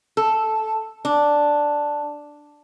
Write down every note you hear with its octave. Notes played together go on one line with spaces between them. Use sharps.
A4
D4